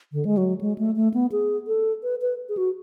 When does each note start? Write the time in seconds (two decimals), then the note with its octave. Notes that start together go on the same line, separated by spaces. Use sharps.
0.13 D3
0.25 G#3
0.37 F#3
0.61 G#3
0.78 A3
0.96 A3
1.14 B3
1.32 G#4
1.67 A4
2.03 B4
2.22 B4
2.49 G#4
2.57 F#4